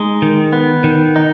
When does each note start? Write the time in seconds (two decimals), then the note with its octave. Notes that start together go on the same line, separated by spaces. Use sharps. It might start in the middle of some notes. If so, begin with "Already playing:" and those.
Already playing: G#3 D#4
0.22 D#3
0.53 B3
0.84 D#3
1.16 D#4